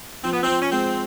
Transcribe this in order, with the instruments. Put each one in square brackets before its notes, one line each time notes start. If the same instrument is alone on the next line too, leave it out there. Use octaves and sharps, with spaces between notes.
[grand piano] F3 [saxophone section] C4
[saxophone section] B3
[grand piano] F3 [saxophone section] C4
[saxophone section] C#4
[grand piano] G#3 [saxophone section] C4